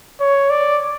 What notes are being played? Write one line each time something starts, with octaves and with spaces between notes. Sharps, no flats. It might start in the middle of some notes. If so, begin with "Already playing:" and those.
C#5
D5